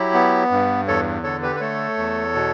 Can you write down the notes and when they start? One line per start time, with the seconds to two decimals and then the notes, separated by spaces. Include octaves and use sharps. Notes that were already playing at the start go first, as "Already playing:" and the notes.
Already playing: F#3 E4 G4
0.14 B3
0.51 G2
0.88 E2 A4 C#5
1.24 D3 A4 C#5
1.42 G4 B4
1.56 B4
1.60 A3 A4 C#5
1.97 E2
2.35 B2